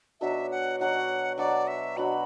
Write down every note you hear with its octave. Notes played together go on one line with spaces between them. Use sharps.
B2 F#3 D4 F#4 E5
F#5
B2 F#3 D4 F#4 F#5
B2 F#3 D4 F#4 D5
E5
B2 F#3 D4 F#4 B5